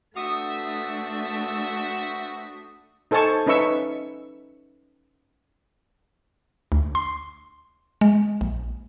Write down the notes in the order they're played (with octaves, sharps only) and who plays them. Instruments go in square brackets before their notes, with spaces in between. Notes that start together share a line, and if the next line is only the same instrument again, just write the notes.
[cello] A3 D4 [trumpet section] C4 B4 E5 [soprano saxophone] F#4 [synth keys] D#6
[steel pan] D#4 A4 C5 G#5 A5 C#6
C#4 D#4 B4 E5 C#6 E6
[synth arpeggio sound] D2
C6
G#3
A#1